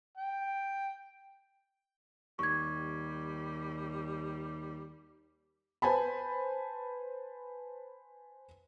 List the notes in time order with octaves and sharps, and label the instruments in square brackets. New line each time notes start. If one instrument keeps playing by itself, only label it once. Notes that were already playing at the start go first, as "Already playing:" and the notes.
[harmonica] G5
[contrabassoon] D#2 [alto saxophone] G3 [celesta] C#6 G#6
[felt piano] B4 C5 G#5 A5 B5